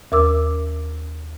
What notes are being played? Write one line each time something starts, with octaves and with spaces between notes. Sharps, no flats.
D#2 A#4 D6 E6